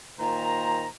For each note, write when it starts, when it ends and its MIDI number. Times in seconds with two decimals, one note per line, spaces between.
0.19 0.85 46
0.19 0.85 51
0.19 0.85 72
0.19 0.85 82